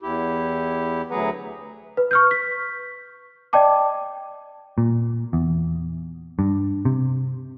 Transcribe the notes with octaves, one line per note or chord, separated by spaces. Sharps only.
E2 E4 G4
D2 F#3 G#4 B4 F#5 A#5
B4
C#6 F6 G6
B6
D5 D#5 G5 A5 D6
A#2
E2
G2
C3